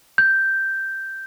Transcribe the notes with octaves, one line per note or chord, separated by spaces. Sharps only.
G6